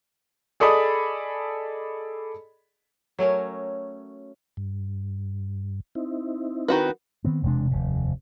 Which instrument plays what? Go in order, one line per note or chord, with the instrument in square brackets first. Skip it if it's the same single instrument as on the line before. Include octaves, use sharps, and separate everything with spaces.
[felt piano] G#4 A4 D5 D#5 B5 D#6
[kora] F#3 A3 C#4 A#4
[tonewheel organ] G2
C4 D#4 E4
[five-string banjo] D#3 F#4 B4
[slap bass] D#3 B3 C4
E1 C3 G#3 D4
F1 D#2 C3